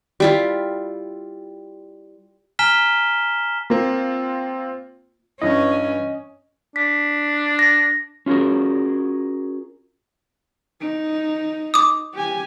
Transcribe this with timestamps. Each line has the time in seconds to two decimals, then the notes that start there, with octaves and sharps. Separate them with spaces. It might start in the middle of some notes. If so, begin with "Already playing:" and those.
0.20 G3 E4 F4
2.59 G#5 A#5 F6 B6 E7 G7
3.70 A#3 C4 F4
5.42 G2 E3 C#4 E4 D#5
6.76 D4 B6
7.59 A#6
8.26 C#4 F4 F#4 G#4 A#4
10.80 D#4
11.74 D6 D#6
12.14 G4 G#5